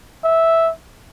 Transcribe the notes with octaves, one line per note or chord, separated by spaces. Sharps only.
E5